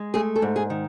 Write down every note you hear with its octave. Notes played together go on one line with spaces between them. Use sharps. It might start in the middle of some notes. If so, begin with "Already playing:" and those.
Already playing: G#3
A3 G#4
A4
G#2
G#4
D#3